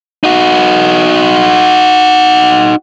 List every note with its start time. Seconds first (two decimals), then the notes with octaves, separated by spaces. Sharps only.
0.24 D#4 F#4